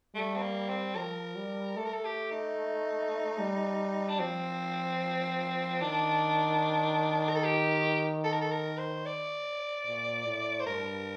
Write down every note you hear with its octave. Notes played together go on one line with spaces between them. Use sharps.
G3 A3
C4
A#3
C4
F3 A#4
G3
A3 A4
A#4
A4
G4
D#4
G3
D4
F3 C4
D#3 D4
A#4
A4
G4
A4
A#4
A4
A#4
C5
D5
A#2
A2
C5
G2 A#4